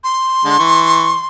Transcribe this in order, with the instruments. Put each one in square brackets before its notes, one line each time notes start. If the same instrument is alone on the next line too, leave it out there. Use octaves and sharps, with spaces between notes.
[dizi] C6
[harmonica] D3 G#3
E3 C#6